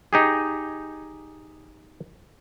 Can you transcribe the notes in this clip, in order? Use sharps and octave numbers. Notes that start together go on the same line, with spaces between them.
D#4 G4 G#4